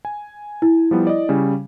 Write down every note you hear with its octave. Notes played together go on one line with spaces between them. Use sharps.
G#5
E4
F3 G3 B3
D5 D#5
C#3 G3 C#4